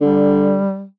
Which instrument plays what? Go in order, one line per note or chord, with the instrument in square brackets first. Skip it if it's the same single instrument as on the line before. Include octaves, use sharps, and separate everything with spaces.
[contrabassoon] D3 [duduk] G3